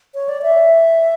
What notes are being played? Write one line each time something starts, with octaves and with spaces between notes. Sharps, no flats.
C#5
D5
E5